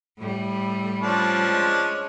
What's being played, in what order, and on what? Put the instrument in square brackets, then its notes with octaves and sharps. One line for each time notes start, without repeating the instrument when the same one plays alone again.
[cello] A2 G3
[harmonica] F3 C#4 D4
[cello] G#3